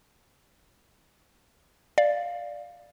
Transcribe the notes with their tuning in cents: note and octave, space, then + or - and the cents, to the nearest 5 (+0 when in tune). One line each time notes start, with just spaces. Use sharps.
D5 +0 F5 +5